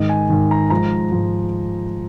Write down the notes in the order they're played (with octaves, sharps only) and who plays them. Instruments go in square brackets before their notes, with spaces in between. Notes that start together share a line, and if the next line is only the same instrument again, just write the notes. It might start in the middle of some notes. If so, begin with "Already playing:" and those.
Already playing: [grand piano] G#2 D#3 D#5
G#5
G#2 D#3
A#5
G#2 F3 A#5
G#2 F3